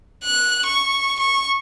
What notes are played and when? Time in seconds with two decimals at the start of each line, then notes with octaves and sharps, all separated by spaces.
0.24 F#6
0.66 C#6
1.19 C#6